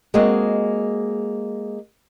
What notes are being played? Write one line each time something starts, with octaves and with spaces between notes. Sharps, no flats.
G#3 A#3 C4 F#4 G#4 D#5